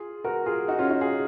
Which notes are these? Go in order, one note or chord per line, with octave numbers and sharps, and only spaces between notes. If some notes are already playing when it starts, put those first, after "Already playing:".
Already playing: F4 G#4
F#4 A#4
F4 G#4
D#4 F#4
C#4 F4
D#4 F#4
F4 G#4